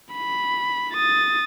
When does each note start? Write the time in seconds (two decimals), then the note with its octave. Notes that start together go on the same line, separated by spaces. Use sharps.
0.14 B5
0.93 D#6 A6